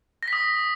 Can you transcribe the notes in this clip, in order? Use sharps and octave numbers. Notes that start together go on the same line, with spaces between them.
A#6
B6
D#6